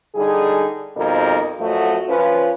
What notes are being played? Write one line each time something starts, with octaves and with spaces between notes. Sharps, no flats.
D3 G3 D#4 G#4
F2 B2 G3 D#4 A#4 C5
F#2 F3 F#3 A3 F#4 D#5
F3 C#4 B4